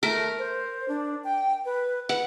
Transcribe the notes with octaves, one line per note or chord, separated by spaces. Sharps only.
A3 A#4
C5
D4
G5
B4
B4 F#5